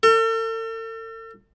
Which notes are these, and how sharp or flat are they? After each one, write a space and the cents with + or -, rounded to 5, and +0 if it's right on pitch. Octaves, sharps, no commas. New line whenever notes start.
A4 +45